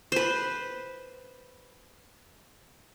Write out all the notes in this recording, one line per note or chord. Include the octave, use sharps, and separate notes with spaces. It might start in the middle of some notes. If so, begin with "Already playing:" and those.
B4 C5